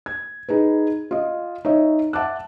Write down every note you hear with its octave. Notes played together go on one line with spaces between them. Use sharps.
G#6
D#4 G#4 B4
F4 D#5
D#4 C#5 D#5 E5
E5 F#5 A5 D6 F#6